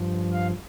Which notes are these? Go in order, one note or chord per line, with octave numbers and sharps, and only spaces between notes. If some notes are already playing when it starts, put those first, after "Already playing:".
Already playing: G2 F3
F5